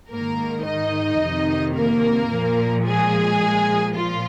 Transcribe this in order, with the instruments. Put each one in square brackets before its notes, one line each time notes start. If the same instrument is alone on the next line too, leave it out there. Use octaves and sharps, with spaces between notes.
[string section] G#2 D#3 A#3 A#4
D#4 D#5
F2 C3 D#3
A#3 A#4
A#2 F3
G#3 G#4
A#2 F3
F3 F4